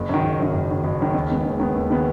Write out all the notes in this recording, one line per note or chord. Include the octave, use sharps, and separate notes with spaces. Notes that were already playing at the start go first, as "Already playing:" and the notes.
Already playing: F#1
F#2 D#3
F#1
F#2 D#3
F#1
F#2 D#3
F#1
F#2 D#3
D#2
D#3 G#3 B3
D#2
D#3 G#3 B3
D#2
D#3 G#3 B3